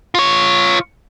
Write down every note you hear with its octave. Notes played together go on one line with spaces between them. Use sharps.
F4 C#5